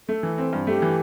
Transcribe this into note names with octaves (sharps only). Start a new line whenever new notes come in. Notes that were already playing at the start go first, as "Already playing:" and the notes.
A3 A4
E3
C4
G2
A3 G4
E3